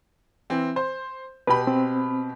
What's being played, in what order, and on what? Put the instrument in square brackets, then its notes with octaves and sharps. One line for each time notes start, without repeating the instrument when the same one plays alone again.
[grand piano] E3 C4
C5
[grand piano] B2 G4 B5 [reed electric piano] B4
[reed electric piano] C4